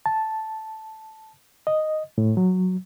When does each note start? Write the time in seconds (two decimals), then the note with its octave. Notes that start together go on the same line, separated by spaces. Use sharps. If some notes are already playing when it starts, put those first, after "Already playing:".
0.06 A5
1.67 D#5
2.18 A2
2.37 F#3